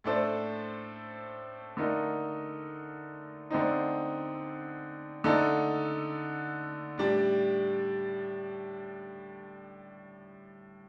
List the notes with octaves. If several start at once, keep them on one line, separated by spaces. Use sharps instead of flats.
A2 A3 D4 A4 C5
D3 A3 D#4 A#4
D3 A3 C4 D#4
D3 A3 D#4 A4
A2 G3 D4